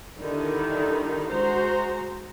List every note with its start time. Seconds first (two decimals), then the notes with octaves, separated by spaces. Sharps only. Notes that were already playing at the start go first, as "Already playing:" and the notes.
0.20 D3 D#3 G3 D#4 E4
1.31 G#3 F#4 C5 A#5